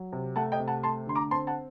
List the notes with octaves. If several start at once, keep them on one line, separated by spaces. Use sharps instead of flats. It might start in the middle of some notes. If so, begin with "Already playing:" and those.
Already playing: F#3
C3
A3 F#5 A5
D#5 G5
C3
F#5 A5
A3 A5 C6
D3 C6
A#5 D6
C4 A5 C6
F#5 A5